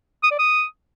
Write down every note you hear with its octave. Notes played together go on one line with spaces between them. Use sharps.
D#6
D5
D#6